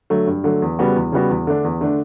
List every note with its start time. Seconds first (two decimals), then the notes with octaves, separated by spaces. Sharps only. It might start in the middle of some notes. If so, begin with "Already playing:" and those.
0.10 D3 F#3 A3
0.27 G2
0.44 D3 F#3 A3
0.62 E2
0.79 C#3 G3 B3 F#4
0.96 E2
1.12 C#3 G3 B3 F#4
1.30 E2
1.47 D3 A3 D4
1.64 E2
1.81 D3 A3 D4